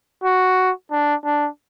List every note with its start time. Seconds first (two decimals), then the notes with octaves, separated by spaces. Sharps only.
0.24 F#4
0.91 D4
1.24 D4